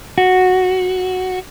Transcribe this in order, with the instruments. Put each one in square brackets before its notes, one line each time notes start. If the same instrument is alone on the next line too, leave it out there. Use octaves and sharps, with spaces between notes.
[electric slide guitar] F#4